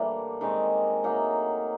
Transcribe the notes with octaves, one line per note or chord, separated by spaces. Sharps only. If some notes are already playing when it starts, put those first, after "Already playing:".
Already playing: A2 E3 G3 A#3 D4
D#3 G#3 C4 D#4
A2 F#3 A#3 D#4